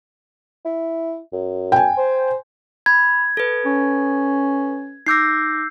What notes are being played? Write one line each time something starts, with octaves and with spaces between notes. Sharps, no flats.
E4
F#2
G5 G#5
C5
B5 G#6
A4 B4
C#4
D#4 D6 E6 G6 A#6 C7